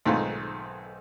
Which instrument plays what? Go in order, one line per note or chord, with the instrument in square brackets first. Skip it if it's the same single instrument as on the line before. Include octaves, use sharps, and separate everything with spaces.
[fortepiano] B1 G#2 D#3 A3 C4 F4